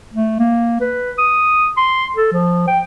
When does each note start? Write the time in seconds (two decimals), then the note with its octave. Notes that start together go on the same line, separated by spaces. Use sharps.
0.14 A3
0.39 A#3
0.81 B4
1.18 D#6
1.77 C6
2.17 A4
2.32 F3
2.67 G5